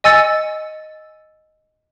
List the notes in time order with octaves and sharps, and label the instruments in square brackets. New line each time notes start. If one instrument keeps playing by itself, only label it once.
[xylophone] D#5 G#5 E6 A6 C#7